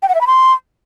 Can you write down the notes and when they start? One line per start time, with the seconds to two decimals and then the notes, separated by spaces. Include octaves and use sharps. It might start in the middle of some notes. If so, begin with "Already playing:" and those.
0.02 G5
0.09 F#5
0.15 E5
0.21 B5
0.27 C6